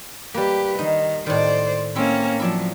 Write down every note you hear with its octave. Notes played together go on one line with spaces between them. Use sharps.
G3 A#3 G4 B4
D#3 D#4
A2 D#3 C5 D5
A#3 C4 C#4 E4
F3 F#3 E4 D5 A5